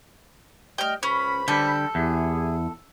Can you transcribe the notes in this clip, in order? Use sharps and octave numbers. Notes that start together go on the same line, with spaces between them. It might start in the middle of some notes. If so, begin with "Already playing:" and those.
G3 A3 D#5 G5 F6
C#2 C#4 C5 B5
D3 G3 A4
E2 E4 G4 G#4